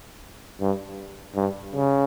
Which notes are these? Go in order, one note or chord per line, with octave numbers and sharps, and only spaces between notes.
G2
G2
C#3